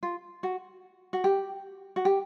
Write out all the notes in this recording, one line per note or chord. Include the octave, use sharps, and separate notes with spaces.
F4
F#4
F#4
G4
F#4
G4